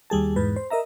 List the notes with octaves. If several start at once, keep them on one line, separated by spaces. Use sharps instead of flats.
D#2 G3 G#4 A5
E2 G#2 B4
C5
A#4 D#5 E5 A#5